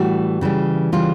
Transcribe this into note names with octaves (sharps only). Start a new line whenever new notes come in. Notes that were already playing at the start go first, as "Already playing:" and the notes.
Already playing: A2 E3 G3 F#4
C#3 E3 G3
C#3 E3 G3 F4